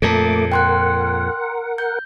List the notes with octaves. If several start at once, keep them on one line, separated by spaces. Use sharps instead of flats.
F2 A#2 A3 A4 A#4 A5 D6
A#4 F#5 G5 C6 F#6
G6